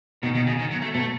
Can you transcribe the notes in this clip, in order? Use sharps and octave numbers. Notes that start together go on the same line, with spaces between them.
B2 D#3
D#3
C#3
D#3
F#3
A3
B2 A3